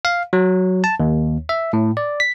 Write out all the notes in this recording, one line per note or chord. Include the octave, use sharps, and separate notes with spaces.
F5
F#3
A5
D#2
E5
A2
D5
B6